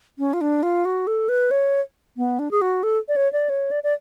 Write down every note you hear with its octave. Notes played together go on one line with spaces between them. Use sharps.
C#4
F4
D4
F4
F#4
A4
B4
C#5
B3
D4
G#4
F#4
A4
D5
C#5
D5
C#5
D5
D5